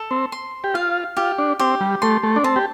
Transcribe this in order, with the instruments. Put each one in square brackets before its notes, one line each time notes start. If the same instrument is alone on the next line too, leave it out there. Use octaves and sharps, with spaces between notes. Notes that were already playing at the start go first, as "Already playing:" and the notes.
Already playing: [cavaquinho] A4
[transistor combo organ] C4
[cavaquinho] C6
[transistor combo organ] G4
[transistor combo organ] F4 [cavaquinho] F5
[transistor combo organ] F4 [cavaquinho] G4
[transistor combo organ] D4
[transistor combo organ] C4 [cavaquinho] G4
[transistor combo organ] G3
[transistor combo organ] A3 [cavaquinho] C6
[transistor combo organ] A3
D4
[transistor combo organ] C4 [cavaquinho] A5
[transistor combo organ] G4